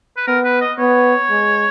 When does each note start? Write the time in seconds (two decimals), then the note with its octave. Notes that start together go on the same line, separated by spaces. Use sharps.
0.17 B4
0.27 B3 A#4
0.44 B4
0.61 D#5
0.78 B3 C#5
1.30 G#3